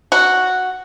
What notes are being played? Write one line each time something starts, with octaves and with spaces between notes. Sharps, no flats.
F#4